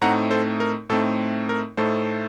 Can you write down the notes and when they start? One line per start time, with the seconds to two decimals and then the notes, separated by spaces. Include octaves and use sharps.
0.01 A2 A3 C4 D#4 F#5 A#5
0.31 A4 C5
0.60 A#4
0.89 A2 A3 C4 D#4 A4
1.49 A#4
1.77 A2 A3 D#4 A4 C5